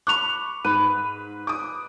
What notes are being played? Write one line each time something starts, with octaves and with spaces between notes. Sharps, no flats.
B5 C#6 D6 F#6 F7
G#2 B4 D#7
D6 D#6